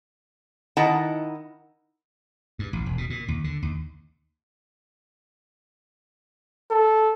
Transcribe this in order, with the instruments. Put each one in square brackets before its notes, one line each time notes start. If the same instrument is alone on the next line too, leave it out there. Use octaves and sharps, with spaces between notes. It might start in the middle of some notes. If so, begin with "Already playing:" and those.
[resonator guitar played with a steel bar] D#3 D#4 E4 F#5 A5 A#5
[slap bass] G2
A1
E1
B2
A#2
D#2
D3
D#2
[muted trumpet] A4